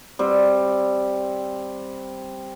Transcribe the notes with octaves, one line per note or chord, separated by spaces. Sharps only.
G3 C4